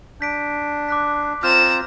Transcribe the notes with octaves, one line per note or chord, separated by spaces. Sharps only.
D4 G6 B6 D7
D6 F#6 B6
C4 F4 A#5 F6 G6 E7